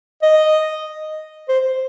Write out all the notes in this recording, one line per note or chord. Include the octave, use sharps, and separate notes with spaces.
D#5
C5